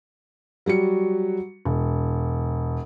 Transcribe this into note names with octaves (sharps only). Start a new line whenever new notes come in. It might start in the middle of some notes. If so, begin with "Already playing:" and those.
F#3 G3 F#4 C#7
E1